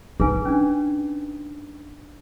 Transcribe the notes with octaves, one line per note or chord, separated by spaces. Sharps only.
D#4 G#4 B4 G#5
C#4 D4